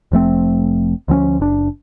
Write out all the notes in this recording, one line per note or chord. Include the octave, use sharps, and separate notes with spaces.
F1 F3 A3 C4
D2 F3 C4 C#4
F#1 D4